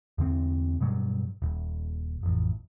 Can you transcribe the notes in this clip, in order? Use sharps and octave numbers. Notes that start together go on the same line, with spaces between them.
E2 D3 C4
G2 B2 F#3 G3
D#1
A1 F2